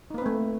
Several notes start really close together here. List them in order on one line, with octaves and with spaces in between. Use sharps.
D#4 A#3 B4 C4 A3